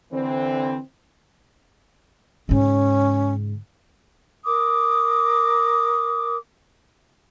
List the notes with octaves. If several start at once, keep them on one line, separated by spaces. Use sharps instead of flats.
D3 E3 C4
G#2 C#3 C#4
A#4 D6 D#6